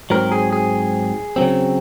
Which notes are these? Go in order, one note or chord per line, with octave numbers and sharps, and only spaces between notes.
G#2 F#3 C4 A#4
G#4
G#4
C#3 F#3 C4